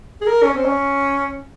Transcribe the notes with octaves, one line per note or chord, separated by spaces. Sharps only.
G#4
A#4
C#4
C4
C#4